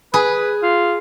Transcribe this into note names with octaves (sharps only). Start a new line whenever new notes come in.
G#4 B4
F4